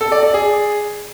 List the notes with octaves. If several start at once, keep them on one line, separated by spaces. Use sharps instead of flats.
A4
D5
D5
G#4